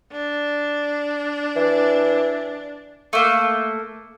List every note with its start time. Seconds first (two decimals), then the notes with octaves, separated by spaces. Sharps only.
0.12 D4
1.55 E3
3.13 A3 A#3